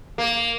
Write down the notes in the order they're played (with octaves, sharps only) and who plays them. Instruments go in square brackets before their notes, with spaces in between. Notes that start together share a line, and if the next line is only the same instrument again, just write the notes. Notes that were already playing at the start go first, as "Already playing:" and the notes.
[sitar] A#3